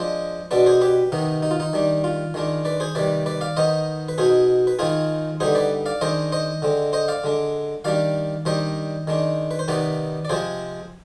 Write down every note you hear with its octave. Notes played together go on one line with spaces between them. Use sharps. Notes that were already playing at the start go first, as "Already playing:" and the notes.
Already playing: F3 G#3 D4 C5 D#5
B2 G#3 B3 D4 B4 D5
G#4 C5
G4 B4
C3 D#3 B3 D#4
D#4
F4
D#4
D#3 G3 D4
F4
D#3 G#3 D4
B4 D5
G#4 C5
C3 D#3 G3 B4 D5
B4 D5
D5 F5
D#3 B3 D#4 C5 D#5
B4
B2 B3 D#4 G#4 C5
B4
D#3 G#3 C4 D#4 F4 G#4
D3 G3 B3 D#4 G#4 C5
B4 D5
D5 F5
D#3 G#3 D4 C5 D#5
C5 D#5
D3 G#3 C4
C5 D#5
D5 F5
D3 G#3 D4
D#3 G3 D4 D5 F5
D#3 G3 D4 C5 D#5
D#3 G#3 D4
B4
C5
C3 D#3 B3 D#4 B4 D5
D5
C3 F3 G#3 C4 G#4 C5